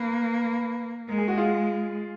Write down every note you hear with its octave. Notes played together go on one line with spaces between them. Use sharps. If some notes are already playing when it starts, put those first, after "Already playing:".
Already playing: A#3 B4
G#3 A#4
G#4
F#4
F4 G#4